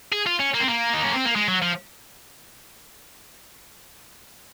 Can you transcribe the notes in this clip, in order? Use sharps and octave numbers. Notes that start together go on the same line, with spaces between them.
G#4
F4
C#4
A#3
C4
A#3
D#4
C#4
C4
A#3
G#3
F#3
F3